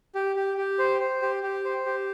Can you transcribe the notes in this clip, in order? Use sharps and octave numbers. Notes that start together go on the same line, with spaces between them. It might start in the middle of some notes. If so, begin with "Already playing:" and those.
G4
G4
G4
C5
C5
G4
G4
C5
G4